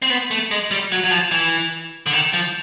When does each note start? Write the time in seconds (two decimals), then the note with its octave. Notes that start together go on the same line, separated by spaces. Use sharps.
0.02 C4
0.10 B3
0.31 A3
0.51 G#3
0.71 G3
0.92 F#3
1.04 F#3
1.11 F3
1.31 E3
2.06 D3
2.13 D#3
2.33 F3